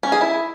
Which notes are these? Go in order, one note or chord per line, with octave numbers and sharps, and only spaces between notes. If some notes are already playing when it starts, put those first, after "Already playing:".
C#4
G#4
E4